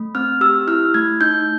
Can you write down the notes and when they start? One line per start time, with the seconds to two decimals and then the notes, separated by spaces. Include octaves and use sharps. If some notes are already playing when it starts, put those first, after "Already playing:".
Already playing: A3
0.15 C4 F6
0.41 G4 E6
0.67 E4 F6
0.94 A3 G#6
1.21 D#4 G6